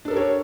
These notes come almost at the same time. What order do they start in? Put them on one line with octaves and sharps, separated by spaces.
D4 A4 A#4 G4 C#5